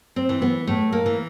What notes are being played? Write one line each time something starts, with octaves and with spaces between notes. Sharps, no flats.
C4
E3
B3
A2 A3
A#3
E3